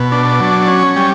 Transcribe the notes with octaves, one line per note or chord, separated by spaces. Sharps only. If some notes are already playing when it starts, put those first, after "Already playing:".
Already playing: B2
D4
F#3
C#4
G3